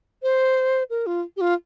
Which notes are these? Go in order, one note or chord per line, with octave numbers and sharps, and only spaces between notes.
C5
A#4
F4
G4
F4